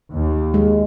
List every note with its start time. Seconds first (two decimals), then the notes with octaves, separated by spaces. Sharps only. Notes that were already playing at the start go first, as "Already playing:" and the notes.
0.11 D#2
0.54 G#3